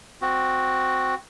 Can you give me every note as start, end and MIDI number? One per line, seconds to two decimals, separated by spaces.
0.22 1.15 60
0.22 1.15 66